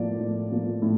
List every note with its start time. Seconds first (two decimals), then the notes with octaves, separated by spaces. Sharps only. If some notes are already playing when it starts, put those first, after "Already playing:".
Already playing: A2 F3 A#3 D5
0.19 A2
0.51 F3 A#3
0.82 A2